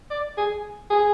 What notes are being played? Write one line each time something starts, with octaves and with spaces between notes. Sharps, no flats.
D5
G#4
G#4